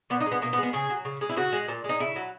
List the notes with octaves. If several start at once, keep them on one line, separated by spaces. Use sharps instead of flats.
A#2 B3
D#4
G#3
B3
B2 A#3
B3
G#3
B3
C#3 G#4
F#3
C#3
G#3
E4
C#3 F#4
G#3
A#2
G#3
D#4
C#3 E4
F#3